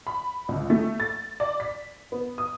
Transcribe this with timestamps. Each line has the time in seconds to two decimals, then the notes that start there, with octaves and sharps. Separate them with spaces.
0.07 B5
0.49 C#2
0.70 A3
1.00 A6
1.40 D5
1.60 B6
2.12 B3
2.38 D#6